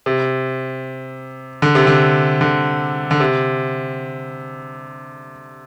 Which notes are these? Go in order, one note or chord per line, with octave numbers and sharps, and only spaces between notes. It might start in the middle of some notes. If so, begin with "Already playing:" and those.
C3
D3
C3
D3
D3
D3
C3